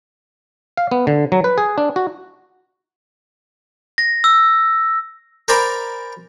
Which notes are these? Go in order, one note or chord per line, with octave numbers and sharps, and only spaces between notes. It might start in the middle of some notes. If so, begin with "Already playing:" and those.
F5
B3
D3
F#3
B4
G#4
D4
F#4
A#6
E6
A#4 C5 D5 G#5 A#5 B5